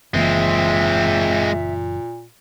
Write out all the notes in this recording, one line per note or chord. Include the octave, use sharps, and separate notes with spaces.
F#1 A#2 E3 G#3 A#3 C4 E5